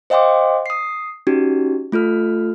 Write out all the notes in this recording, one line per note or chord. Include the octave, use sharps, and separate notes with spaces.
C5 D#5 F5 G5 C6 D6
D#6 C7
C#4 D#4 F#4 G4
A3 F4 A4 F6